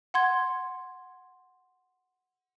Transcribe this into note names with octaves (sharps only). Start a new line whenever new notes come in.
F#5 C6 G#6